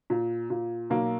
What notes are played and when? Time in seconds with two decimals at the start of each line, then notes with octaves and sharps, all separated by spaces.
0.10 A#2
0.50 A#2
0.90 B1 A#3